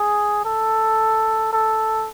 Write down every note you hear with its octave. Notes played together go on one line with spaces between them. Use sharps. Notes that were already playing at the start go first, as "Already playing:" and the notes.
Already playing: G#4
A4
A4